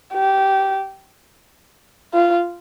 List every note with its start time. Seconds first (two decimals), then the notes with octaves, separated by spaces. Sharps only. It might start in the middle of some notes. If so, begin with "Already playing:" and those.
0.13 G4
2.14 F4